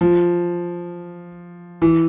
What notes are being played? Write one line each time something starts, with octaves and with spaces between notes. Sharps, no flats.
F3
E3